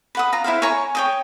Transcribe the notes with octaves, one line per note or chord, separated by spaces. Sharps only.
B4 F#5 D#6
F4 A#5
E4 B4 C5 F5
C#5 G#5 A#5 C#6
C#5 G5 D#6